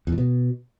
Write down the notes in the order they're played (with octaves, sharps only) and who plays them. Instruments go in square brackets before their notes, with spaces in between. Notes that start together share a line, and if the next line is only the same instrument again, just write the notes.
[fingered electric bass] E2
A2
B2